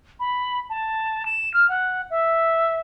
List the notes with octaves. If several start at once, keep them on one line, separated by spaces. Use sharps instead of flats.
B5
A5
E7
F6
F#5
E5